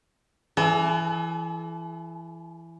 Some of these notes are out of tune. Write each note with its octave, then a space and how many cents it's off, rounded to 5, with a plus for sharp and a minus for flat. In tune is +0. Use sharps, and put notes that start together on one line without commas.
E3 +15 A4 -45